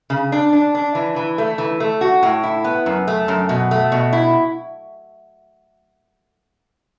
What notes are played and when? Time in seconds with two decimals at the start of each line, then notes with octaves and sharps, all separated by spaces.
0.10 C#3
0.32 D4
0.53 D4
0.75 D4
0.95 E3
1.16 E3
1.38 A3
1.58 E3
1.80 A3
2.01 F#4
2.23 A2
2.43 E4
2.64 B3
2.86 F#2
3.07 A3
3.28 F#2
3.49 B2
3.71 A3
3.92 B2
4.13 E4